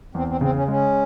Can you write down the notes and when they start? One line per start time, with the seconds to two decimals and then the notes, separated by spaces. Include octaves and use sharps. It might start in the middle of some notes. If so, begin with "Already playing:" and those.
0.14 E2 C4
0.27 C4
0.41 C#3 C4
0.54 C#4
0.68 G#3 C#4